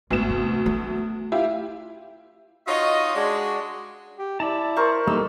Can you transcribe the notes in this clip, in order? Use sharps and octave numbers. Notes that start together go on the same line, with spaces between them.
G#1 D2 B3 E7
C3
A3
E4 F4 G4
D#4 F4 F#4 C#5 D#5
G#3 D4 F#4
G4
E4 D5 A5
A#4 C5 C#6
G3 A3 A#3 D#4 E6